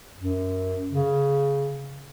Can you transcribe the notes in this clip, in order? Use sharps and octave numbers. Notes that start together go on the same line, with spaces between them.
F#2
C#3